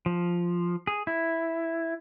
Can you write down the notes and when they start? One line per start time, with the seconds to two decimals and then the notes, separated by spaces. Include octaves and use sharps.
0.06 F3
0.87 G#4
1.07 E4